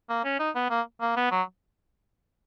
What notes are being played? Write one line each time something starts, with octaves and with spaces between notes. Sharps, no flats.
A#3
C#4
D#4
B3
A#3
A#3
B3
F#3